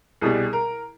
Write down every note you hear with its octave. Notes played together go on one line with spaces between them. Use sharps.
C2 B2 G3 G#4
A#4